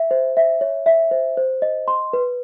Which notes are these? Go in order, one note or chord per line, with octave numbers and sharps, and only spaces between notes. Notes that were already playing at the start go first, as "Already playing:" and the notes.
Already playing: E5
C5
E5
C#5
E5
C5
C5
D#5
C6
B4